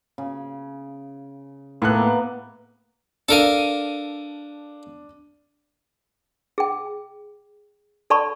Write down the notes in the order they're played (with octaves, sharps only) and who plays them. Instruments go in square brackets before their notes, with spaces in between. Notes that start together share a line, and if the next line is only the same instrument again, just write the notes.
[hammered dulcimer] C#3
[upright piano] A2 A4 F#6 [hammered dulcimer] A#3 B3 D6
[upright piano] D4 D#7 [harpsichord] A4 A#4 F5
[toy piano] G#4 G5
A4 D5 A5 B5 C#6